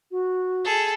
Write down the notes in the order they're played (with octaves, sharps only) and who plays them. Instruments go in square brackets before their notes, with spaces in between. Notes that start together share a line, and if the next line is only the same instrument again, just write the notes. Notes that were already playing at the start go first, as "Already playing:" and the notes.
[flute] F#4
[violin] G#4 A4